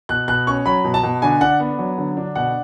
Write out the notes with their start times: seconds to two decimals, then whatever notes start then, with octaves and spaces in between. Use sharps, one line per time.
0.09 B2 F#6
0.28 B2 F#6
0.47 C#4 C#6
0.66 F#3 B5
0.84 B2
0.94 A5
1.03 B2
1.22 D3 G#5
1.41 D4 F#5
1.60 B3
1.79 F#3
1.98 D3
2.17 D4
2.36 B2 F#5